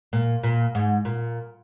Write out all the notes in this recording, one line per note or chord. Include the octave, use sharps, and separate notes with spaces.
A#2
A#2
G#2
A#2